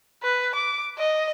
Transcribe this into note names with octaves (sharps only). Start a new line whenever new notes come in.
B4
D6
D#5